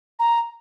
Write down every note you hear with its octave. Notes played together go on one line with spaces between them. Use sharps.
A#5